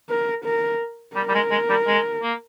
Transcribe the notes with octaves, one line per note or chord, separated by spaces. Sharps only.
A#4
A#4
G3 A#4
G3
G#3
G#3
G3
G#3
A#3